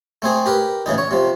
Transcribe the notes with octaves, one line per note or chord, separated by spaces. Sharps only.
A3 C4 G#4
G4 A#4 B4
A2 C#3 E3 D#4
C#5
C3 F3